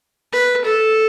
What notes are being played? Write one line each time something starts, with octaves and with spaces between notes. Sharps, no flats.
B4
A4